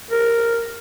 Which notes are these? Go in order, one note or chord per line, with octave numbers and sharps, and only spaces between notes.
A#4